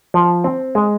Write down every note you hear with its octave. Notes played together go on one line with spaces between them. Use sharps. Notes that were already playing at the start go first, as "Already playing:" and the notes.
F3
C4
G#3